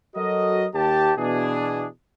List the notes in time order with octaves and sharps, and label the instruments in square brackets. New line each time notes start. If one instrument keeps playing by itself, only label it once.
[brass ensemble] F#3 F#4 A4 A#4 D#5
D#2 G4 A5
B2 E3 D4 G#4